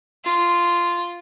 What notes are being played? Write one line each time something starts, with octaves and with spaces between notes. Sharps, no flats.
F4